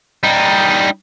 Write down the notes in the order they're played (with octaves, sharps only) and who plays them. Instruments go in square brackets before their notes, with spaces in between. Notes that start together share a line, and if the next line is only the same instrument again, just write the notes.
[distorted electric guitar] G3 D#4